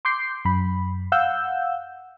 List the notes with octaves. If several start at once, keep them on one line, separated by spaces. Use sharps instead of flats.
C6 D6 G6 C7
F#2 B5
F5 F#5 E6 G6